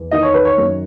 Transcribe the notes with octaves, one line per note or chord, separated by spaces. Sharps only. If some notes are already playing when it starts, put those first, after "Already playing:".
Already playing: E2
D#3 D#5
C#5
B4
C#5
F#2